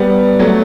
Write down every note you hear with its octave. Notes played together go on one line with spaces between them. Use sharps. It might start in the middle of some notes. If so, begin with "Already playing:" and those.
Already playing: G3 B3
F#3 A3